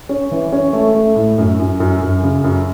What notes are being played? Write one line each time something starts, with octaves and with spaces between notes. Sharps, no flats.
C#4
E3
C#4
A3
A3
A2
F#2
F#2
F#2
F#2
C#3
F#2